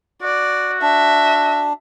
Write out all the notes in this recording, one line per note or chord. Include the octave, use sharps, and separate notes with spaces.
F#4 D5
D4 E5